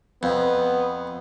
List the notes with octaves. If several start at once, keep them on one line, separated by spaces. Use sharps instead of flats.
F2 B3